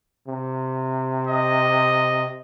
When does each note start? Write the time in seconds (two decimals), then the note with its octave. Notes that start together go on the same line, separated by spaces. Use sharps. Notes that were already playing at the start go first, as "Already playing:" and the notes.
0.28 C3
1.27 D#5